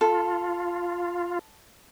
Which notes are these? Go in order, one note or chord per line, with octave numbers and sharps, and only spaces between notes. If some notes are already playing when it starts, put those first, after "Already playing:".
F4 A4